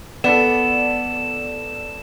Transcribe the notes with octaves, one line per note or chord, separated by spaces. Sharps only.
B3 A4 D5 E7